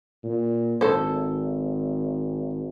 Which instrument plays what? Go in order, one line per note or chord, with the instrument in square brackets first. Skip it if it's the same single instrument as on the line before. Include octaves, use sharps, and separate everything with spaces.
[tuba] A#2
[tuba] G#1 [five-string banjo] A4 C5